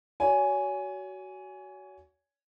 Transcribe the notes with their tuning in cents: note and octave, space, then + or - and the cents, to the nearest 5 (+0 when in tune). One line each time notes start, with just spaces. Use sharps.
F#4 +20 C#5 +35 G#5 +0